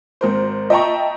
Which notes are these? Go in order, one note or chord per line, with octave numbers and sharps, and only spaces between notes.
G#1 A#4 C5
D#5 E5 G5 A5 A#5 C#6